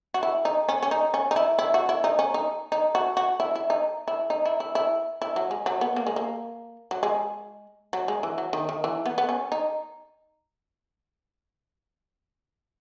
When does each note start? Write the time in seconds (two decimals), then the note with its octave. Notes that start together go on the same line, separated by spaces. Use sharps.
0.14 F#4
0.23 E4
0.45 D#4
0.69 C#4
0.83 C#4
0.91 D#4
1.14 C#4
1.31 D#4
1.36 E4
1.59 E4
1.74 F#4
1.89 E4
2.04 D#4
2.19 C#4
2.34 D#4
2.72 D#4
2.95 F#4
3.17 F#4
3.40 E4
3.55 E4
3.70 D#4
4.08 E4
4.30 D#4
4.45 E4
4.60 E4
4.75 E4
5.22 E4
5.36 F#3
5.51 G#3
5.66 F#3
5.81 B3
5.96 A#3
6.07 G#3
6.16 A#3
6.91 F#3
7.03 G#3
7.93 F#3
8.08 G#3
8.23 E3
8.38 F#3
8.53 D#3
8.69 D#3
8.84 E3
9.06 B3
9.18 B3
9.29 C#4
9.52 D#4